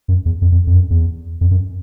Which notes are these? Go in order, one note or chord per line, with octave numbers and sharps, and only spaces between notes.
F#2
E2
F2
F2
F2
F#2
E2
F2
F#2